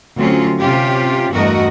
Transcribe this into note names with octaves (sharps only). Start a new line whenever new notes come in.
D2 F#3 C4 C#4 F4
C3 C#4 F4 G4
E2 G2 A3 F#4 A#4 D#5